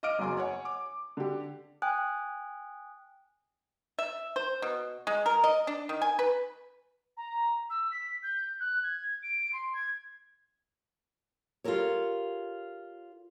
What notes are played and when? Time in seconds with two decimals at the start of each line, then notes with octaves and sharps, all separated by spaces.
0.03 D#5 F5 D6 F6 D7
0.19 F#1 E2 F#3 G#5 C6 D6
0.37 C#5 F#5 G#5
0.65 D6
1.17 D3 G4
1.82 G5 G#5 D#6 F#6
3.99 E5
4.36 C5
4.62 B2
5.07 G#3
5.26 A#4
5.44 D#5
5.67 D4
5.89 D#3
6.02 G#5
6.19 B4
7.17 A#5
7.69 E6
7.91 B6
8.22 G6
8.60 F#6
8.83 G#6
9.22 D7
9.52 C6
9.73 G#6
11.64 F4 G4 A4 A#4 C#5